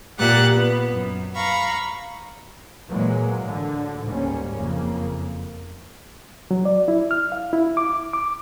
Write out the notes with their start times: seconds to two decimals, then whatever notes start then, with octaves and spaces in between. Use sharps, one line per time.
0.18 A#2 G4 F#5 F#6 A6
0.52 B3
0.92 F#2
1.35 F5 A#5 B5 C#6
2.90 A#2 E3 F#3 G#3 A#3
3.42 A2 D3
4.05 D2 G#2 G3 A#3 C#4
4.54 F#1 F2 C#3 A#3
6.51 F#3
6.65 D5
6.88 E4
7.11 F6
7.32 F5
7.53 E4
7.77 D6
8.13 D6